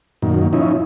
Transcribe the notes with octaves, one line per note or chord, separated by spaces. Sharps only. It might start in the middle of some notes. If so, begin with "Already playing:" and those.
F#2 A#2 D#3
F3 C#4 D#4 E4